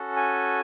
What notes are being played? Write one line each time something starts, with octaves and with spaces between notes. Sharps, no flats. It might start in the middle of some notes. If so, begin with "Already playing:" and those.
Already playing: C#4 F#4 A4
G#5